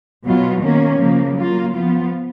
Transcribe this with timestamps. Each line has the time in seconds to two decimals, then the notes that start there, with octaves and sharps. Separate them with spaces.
0.24 B2 F#3 B3 F4
0.62 D#3 A#3 C#4
0.99 C#3 F3 A#3
1.36 F#3 A#3 F4
1.74 F3 B3 F4